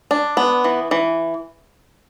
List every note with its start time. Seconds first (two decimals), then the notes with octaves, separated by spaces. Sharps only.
0.11 D4
0.37 B3
0.64 E3
0.91 E3